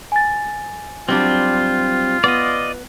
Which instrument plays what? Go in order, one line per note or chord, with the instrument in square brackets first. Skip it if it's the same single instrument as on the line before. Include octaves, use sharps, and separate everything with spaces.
[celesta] G#5 A6
[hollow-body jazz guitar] F#3 G3 D4 [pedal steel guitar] C4 [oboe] F4
[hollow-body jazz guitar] B3 [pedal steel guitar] D5 D#5